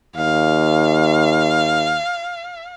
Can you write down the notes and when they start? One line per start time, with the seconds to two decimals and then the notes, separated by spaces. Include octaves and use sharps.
0.16 D#2 F5